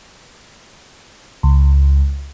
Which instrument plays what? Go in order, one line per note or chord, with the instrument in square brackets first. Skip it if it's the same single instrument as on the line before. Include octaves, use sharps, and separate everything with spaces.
[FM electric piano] C#2